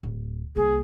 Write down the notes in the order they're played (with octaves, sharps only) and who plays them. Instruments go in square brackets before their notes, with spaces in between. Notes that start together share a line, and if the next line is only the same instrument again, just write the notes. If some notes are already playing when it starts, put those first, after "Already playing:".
[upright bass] D1
[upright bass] C2 A#3 [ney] G#4